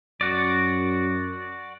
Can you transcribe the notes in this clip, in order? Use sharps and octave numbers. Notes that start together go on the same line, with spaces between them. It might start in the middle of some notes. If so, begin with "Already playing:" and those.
F#2 F#4 D5